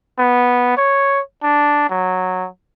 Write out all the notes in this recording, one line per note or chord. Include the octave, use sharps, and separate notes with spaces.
B3
C#5
D4
F#3